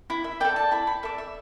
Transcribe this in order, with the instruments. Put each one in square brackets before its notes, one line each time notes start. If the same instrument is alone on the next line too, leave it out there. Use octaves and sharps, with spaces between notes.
[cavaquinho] E4 B5
E5
A4 D5 G5
A5
E4 B5
B5
A4 D5 E5
E5